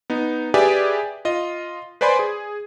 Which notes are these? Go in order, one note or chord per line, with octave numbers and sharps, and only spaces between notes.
B3 D#4
G4 G#4 B4 D5 E5 G#5
F4 D#5
B4 C5 D5 G#5 B5 C6
G#4